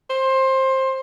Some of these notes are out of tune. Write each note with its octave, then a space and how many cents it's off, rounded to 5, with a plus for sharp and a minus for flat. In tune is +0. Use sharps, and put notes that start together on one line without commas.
C5 +20